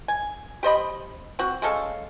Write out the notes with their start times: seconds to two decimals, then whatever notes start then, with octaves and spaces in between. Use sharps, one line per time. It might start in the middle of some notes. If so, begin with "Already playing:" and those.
0.08 G#5
0.63 G4 C5 D#5 B5
1.39 C4 F#4
1.62 G#3 C#4 A4 F5